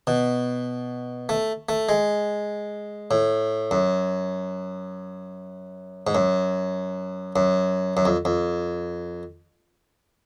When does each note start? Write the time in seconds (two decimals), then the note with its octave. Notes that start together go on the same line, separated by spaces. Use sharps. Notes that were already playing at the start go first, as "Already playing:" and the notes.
0.07 B2
1.29 A3
1.69 A3
1.89 G#3
3.11 A2
3.71 F#2
6.07 G#2
6.15 F#2
7.36 F#2
7.97 F#2
8.05 F2
8.25 F2